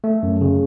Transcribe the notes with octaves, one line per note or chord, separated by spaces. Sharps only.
A3
F#2
C#3